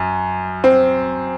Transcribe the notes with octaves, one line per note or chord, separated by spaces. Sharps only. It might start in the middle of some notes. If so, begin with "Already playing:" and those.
Already playing: F#2
C4